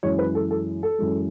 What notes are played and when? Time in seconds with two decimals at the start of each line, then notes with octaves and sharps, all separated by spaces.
0.03 F#2 E3 G#3 C#5
0.19 B4
0.35 A4
0.51 A4
0.83 A4
0.98 F#2 E3 G#3